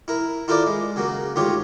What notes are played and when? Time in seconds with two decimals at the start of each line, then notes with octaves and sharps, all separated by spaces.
0.08 E4 A#4
0.48 E4 F4 A4 A#4 C5 D5
0.67 G#3
0.96 C#3 F#3 A#3
1.36 D2 G#2 F4 G4 C#5